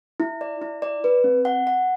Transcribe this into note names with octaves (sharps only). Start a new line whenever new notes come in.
E4
D5
E4
D5
B4
C4
F#5
F#5